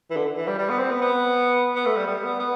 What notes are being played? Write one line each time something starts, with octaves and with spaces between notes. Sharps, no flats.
E3
D3
E3
G3
G3
B3
C4
B3
B3
B3
A3
G3
G3
B3
B3